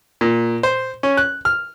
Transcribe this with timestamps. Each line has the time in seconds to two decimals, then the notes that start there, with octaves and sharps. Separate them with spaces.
0.21 A#2
0.63 C5
1.03 C#4
1.17 F#6
1.45 F6